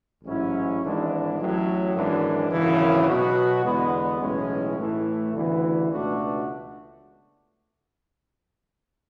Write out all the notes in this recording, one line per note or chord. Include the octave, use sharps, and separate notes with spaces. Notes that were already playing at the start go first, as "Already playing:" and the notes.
A1 G#2 F#3 C#4 E4
G#1 G#2 E3 G#3 D4
A1 A2 F#3
G#1 F#2 E3 G#3 D4
G#1 F#2 C#3 E3
B2 F#3 B3 F#4
E2 D3 G#3 B3
B1 A2 E3 G#3 C#4
A2 E3 A3
D2 C#3 E3 B3
C#2 B2 A3 D4 F#4